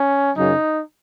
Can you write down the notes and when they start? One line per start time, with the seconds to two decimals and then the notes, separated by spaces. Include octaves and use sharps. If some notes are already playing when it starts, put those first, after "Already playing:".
Already playing: C#4
0.36 F#2 C#3 F#3 D#4